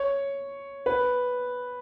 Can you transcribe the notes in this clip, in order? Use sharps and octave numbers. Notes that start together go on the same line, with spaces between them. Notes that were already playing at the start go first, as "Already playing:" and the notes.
Already playing: C#5
B4